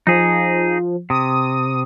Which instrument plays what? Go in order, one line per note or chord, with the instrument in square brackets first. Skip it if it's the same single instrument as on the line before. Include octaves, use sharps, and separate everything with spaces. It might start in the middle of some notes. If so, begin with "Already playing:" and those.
[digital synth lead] F3 [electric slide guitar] D#4 G#4
[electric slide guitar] C3 [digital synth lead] D#6